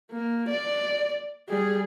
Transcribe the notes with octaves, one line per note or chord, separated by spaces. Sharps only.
A#3
D5
G3 G#4